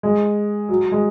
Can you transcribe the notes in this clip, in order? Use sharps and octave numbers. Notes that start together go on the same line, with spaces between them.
G#3
F#3
G#3